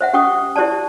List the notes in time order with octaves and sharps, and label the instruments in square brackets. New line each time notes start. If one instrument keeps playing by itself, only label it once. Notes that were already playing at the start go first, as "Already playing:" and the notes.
[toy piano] C5 E5 F#5
C#4 G4 F#5 G5 C#6 D#6
E4 G4 C5 D5 A5